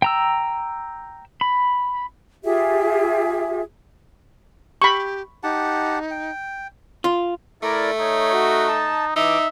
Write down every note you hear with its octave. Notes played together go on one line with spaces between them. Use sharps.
G5 A#5 E6
B5
F4 G4 G#4 E5
G4 B5 C#6
D#4 G4 F#5 A5
G5
F4
A3 E4 A#4 D5
D#4 C#5
F#4
A5
E3 D#4 E5 D6